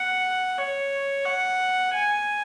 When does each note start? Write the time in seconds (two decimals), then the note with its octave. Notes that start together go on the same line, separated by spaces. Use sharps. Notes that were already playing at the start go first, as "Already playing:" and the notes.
Already playing: F#5
0.58 C#5
1.25 F#5
1.93 G#5